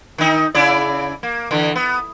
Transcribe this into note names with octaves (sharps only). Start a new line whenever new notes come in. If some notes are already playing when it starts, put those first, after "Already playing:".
D#3 D#4
C#3 E4 D5
A#3
D3 E3
B3